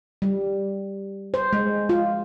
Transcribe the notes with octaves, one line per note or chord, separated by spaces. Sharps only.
G3
C5
G#3
F4